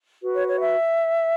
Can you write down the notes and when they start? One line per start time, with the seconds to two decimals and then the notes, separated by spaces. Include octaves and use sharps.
0.22 F#4 B4
0.34 C#5
0.47 C#5
0.59 E5